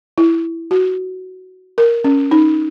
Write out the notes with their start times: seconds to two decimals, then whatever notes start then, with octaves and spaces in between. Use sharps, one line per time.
0.18 E4
0.71 F#4
1.78 A#4
2.04 C#4
2.31 D#4